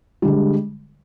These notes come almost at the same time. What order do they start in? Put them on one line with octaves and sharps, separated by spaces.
G3 D3 G#3